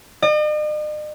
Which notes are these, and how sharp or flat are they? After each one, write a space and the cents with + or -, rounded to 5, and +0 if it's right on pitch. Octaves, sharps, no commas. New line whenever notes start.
D#5 -45